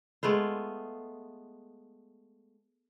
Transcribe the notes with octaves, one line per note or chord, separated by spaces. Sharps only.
G#3 A3 B3 F4